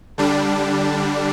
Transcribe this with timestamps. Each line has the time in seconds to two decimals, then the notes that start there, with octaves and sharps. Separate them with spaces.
0.18 D3 G3 D4